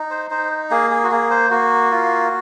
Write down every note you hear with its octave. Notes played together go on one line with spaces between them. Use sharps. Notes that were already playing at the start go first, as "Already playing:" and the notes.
Already playing: D#4
C5
D#4 C5
A#3 G#4
G#4
F#4
A#3 G#4
C5
A#3 F#4
F4